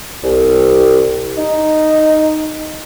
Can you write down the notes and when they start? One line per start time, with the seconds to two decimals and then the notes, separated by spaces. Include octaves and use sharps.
0.24 C2
1.37 D#4